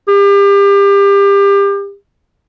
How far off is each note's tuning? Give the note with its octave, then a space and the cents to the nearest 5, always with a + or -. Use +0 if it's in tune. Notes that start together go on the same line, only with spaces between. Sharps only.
G4 +30